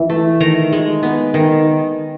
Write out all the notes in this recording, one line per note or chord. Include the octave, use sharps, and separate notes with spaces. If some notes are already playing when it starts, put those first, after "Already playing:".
Already playing: E3
A3
D#3 A#5
G#3
B3
D#3